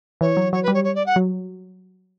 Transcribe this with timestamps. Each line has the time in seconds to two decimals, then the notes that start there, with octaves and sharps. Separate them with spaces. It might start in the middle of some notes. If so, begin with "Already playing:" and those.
0.21 E3 C#5
0.37 F#3
0.52 F#3 C#5
0.63 B4
0.68 G3
0.74 C#5
0.84 C#5
0.95 D5
1.06 F#5
1.16 F#3